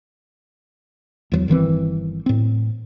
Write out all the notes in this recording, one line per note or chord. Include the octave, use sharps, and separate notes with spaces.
E2 F3 F#3
G1 D#3 E3 C4
A2 C4